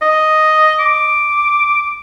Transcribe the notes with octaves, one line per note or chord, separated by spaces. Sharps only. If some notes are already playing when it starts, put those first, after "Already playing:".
D#5
D6